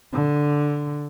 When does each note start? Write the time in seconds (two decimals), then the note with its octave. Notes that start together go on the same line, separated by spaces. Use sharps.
0.13 D3